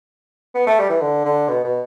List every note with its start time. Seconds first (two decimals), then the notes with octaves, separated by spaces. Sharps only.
0.55 B3
0.67 A3
0.79 G3
0.89 E3
1.01 D3
1.25 D3
1.48 B2
1.64 B2